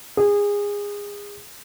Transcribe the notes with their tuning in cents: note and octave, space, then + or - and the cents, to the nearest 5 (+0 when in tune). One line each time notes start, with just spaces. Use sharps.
G#4 -25